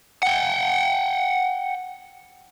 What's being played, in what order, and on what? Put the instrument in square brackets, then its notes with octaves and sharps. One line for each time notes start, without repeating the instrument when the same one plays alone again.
[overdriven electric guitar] F#5 G5